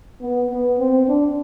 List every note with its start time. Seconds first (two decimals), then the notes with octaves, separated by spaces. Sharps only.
0.22 B3
0.50 B3
0.79 C4
1.08 D4